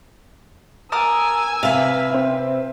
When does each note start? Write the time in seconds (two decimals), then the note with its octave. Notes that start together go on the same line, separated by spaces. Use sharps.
0.92 A#4 G#5 A5 D#6 E6
1.63 C3 B4 E5 F5
2.10 C4 E5